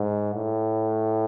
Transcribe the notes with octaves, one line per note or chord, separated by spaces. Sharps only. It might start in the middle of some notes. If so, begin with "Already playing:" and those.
Already playing: G#2
A2